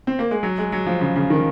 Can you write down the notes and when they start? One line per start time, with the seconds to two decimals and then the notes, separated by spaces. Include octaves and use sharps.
0.07 C4
0.19 A#3
0.31 G#3
0.43 F#3
0.58 G#3
0.72 F#3
0.87 F3
1.01 C#3
1.16 C#3
1.30 D#3